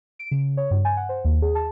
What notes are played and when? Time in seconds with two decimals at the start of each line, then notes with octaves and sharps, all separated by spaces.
0.19 D7
0.31 C#3
0.57 C#5
0.71 G2
0.85 G#5
0.97 F#5
1.09 C5
1.25 D#2
1.42 G#4
1.55 A5